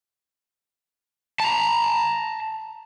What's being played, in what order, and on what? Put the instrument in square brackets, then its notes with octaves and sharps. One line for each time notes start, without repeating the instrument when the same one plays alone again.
[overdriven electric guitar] A5 A#5